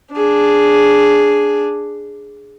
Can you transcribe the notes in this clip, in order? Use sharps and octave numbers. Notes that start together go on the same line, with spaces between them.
D4 G#4